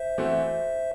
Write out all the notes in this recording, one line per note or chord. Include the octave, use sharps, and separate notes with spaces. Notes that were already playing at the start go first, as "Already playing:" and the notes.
Already playing: C5 E5
E3 A3 C4 F#4